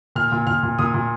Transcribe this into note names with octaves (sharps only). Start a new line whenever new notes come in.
A#2 F6
A#2
A#2 F6
A#2
A#2 D#6
A#2